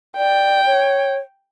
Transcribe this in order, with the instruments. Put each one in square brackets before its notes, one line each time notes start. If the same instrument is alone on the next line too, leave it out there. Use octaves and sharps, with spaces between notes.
[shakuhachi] D5 [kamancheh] G5
[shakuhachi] C#5